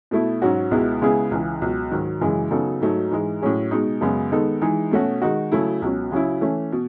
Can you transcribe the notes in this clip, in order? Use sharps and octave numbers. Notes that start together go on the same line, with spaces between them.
B2 A3 E4
G#2 F#3 C#4 F#4
C#2 B2 G#3 B3 E4
C#3 G#3 B3 E4 G#4
C#2 C#3 E3
C#2 B2 F#3
G#2 D#3 F#3
F#2 C#3 E3 G#3
C#3 F#3 B3 D#4 A4
G#2 F#3 A3 D#4
G#2 E3 G#3
A2 F#3 C#4 G#4
B2 G#3 D#4
F#2 C#3 G#3 B3
D#3 G#3 B3 D#4 A4
E3 G#3 D#4 G#4
B2 A3 C#4 F#4
D#3 G#3 D#4 F#4
C#3 F#3 A3 E4
C#2 B2 F#3 C#4
C#3 F#3 C#4 E4
E3 A3 C#4
B2